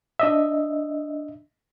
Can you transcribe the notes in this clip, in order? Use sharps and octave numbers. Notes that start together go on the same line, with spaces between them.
D4 D#5 E5